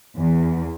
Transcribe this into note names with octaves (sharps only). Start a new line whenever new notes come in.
E2